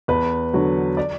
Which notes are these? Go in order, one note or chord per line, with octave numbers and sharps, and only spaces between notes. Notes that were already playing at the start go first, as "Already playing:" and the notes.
E2 B4
D3 F#3
D5